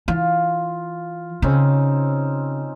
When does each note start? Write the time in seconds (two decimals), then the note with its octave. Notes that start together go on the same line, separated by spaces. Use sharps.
0.08 E3 F4
1.42 C#3 C4 C#4 D#4